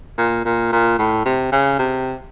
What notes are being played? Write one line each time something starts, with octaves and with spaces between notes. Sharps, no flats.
A#2
A#2
A#2
A2
C3
C#3
C3